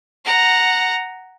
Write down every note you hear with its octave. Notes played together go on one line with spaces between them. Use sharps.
F#5 A#5